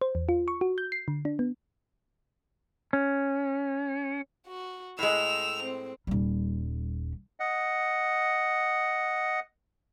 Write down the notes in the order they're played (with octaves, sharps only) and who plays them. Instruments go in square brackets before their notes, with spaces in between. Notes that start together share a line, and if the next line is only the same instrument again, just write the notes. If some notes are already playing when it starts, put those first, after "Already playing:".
[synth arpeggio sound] C5
E2
F4
C#6
F#4
G6
C7
D3
D4
B3
[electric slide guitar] C#4
[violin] F#4
[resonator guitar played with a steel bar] A2 G#3 [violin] E6 F7
[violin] C4
[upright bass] D#1 G3
[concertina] D#5 F#5